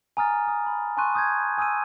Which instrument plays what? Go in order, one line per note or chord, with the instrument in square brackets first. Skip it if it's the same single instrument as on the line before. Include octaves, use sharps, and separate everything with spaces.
[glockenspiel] G#5 A#5 D#6 F6 A6
A#5 D#6
B5
G#5 A5 C6 C#6 F#6 D#7
D#6 G6 G#6
G#5 D#6 E6 G6 D#7